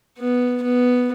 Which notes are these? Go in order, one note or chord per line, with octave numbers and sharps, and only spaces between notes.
B3
B3